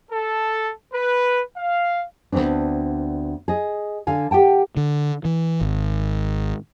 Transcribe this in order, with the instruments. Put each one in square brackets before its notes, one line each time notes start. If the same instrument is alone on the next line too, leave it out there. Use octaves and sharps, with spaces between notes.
[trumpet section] A4
B4
F5
[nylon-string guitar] D2 G2 B3 C4 D4
G#4 D#5
D3 F5 G#5
G4 F#5 G5 A5
[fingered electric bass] D3
E3
G#1